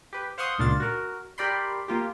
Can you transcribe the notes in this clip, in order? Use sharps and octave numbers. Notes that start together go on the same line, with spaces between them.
G4 B4
C5 F5 F#5 C6 C#6 D#6
C#2 A#2 D4 F4 A6
F#4 A#4
G4 A#4 D5 G5 B5 C6
A#3 F4 G4